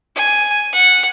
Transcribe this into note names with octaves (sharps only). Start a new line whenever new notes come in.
G#5
F#5